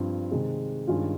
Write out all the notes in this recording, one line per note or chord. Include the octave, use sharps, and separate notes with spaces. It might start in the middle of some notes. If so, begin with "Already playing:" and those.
Already playing: G2 F3 C4 F4
C3 D#3 G#3
G2 D#3 G#3 C#4 F4